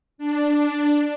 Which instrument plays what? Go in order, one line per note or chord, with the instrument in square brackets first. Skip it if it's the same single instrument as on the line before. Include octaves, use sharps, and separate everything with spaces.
[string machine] D4